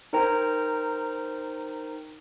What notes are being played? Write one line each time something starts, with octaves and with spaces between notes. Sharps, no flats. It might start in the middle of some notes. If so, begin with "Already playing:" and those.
D#4 A#4 C5 G5 A#5